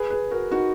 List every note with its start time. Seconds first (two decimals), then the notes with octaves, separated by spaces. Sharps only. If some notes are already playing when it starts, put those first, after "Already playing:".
Already playing: G#4 B4
0.10 G#4 B4
0.31 F#4 A#4
0.51 D#4 F#4